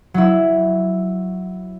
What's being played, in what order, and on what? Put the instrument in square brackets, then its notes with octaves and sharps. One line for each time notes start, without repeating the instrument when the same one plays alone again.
[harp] F#3 E4